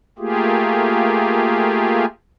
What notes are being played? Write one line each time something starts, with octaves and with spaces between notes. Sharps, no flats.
A3 A#3 F4 G4 G#4